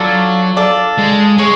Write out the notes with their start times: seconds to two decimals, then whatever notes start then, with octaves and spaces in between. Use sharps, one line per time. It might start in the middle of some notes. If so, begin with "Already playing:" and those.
Already playing: F#3 D4 F4 A4 D5
0.56 D4 F4 A4 D5
0.98 G#3
1.38 G#3 G#4 C#5